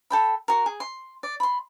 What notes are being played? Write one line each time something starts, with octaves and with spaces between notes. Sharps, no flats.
A4 G5 B5
F#4 A#4
G#4
C6
D5
B5 C6